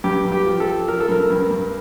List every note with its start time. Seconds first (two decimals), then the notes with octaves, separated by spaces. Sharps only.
0.04 G2 G4
0.25 G2
0.32 G4
0.46 F3
0.60 A4
0.67 F3
0.87 F3 A#4
1.00 A4
1.09 G2 A#4
1.30 G2
1.51 G2